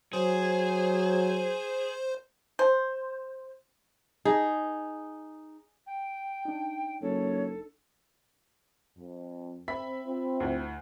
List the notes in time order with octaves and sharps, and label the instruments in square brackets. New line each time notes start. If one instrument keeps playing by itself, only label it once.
[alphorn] F#3 [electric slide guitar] G#4 [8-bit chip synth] C5
[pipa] C5
[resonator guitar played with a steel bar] D#4 [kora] G#4
[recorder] G5
[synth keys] D4 D#4
[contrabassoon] F#1 [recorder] A4 [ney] C#5
[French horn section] F2
[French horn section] C4 [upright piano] E5 B5 B6
[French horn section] C4 F4
[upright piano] D2 E4